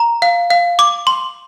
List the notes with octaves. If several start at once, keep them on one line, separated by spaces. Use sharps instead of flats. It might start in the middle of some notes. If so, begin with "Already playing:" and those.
Already playing: A#5
F5
F5
D6
C6